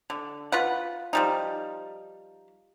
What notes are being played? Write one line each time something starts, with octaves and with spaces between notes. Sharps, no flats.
D3
F4 B4 F#5
F3 G3 D#4